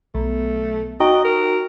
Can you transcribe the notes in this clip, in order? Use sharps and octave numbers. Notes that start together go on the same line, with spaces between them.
B1 A3
D#4 F#4 D#5 G5
A#4